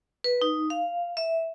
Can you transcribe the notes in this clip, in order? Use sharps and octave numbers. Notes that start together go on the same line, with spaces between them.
B4
D#4
F5
E5